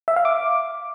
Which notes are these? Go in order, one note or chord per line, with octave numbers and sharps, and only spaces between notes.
E5
F5
D6